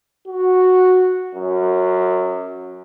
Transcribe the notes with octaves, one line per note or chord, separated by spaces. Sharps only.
F#4
F#2